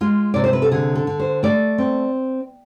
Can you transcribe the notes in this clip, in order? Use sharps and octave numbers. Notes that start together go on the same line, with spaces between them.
G#3 F4
C3 D5
C5
B4
A4
D3 G#4
A4
D3
C5
A3 D5
C4